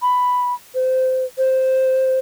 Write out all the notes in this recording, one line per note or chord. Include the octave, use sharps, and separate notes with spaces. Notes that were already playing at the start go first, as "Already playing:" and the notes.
B5
C5
C5